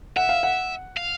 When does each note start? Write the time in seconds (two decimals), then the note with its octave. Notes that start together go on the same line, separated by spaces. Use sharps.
0.16 E5 F#5
0.29 F5
0.43 F#5
0.97 F5